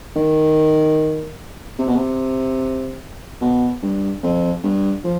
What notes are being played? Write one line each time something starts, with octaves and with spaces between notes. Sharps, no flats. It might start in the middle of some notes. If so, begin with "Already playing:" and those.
D#3
C3
B2
C3
B2
G2
F2
G2
F3